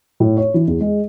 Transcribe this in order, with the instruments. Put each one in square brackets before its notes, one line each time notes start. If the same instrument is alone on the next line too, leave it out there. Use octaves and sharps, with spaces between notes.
[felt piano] A2
C#5
E3
E2
G#3